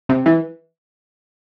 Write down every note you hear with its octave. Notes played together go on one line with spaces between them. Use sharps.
C3
E3